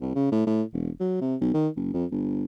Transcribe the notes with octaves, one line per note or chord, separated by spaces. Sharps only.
C2
C#3
A2
A2
E1
F#3
C3
B1
D#3
F#1
F2
G1